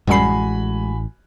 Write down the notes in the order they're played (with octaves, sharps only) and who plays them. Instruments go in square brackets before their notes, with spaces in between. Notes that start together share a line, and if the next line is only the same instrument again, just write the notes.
[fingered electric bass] A1 [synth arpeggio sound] F#2 G3 C7 [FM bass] G#3 [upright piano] F#4 G#5 B5